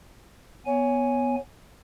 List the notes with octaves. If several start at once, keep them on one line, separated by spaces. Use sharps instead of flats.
B3 C#5 G#5